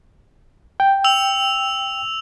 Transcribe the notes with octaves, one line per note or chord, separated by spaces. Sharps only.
G5
E6 F7